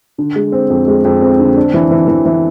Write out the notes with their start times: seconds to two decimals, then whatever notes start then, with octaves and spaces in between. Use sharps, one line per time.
0.18 D3
0.36 G#3
0.52 C4
0.70 F2
0.88 G#3
1.05 F2
1.22 C4
1.39 D3
1.56 D4
1.74 E3
1.91 E3
2.08 E3
2.26 E3